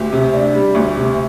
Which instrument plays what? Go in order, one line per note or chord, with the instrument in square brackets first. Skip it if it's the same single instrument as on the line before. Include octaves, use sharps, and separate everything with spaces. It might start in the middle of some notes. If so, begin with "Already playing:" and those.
Already playing: [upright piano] D2 G4
C3
D4
G3
D2
C3